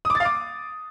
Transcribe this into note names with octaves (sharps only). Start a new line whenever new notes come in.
D#6
D6
A6
F5
D6